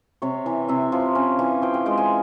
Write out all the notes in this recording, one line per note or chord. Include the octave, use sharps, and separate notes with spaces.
C3 C#5
E3
C3 E5
F3
C#4
E3
F3 G5
G5
G#3 G5
G#5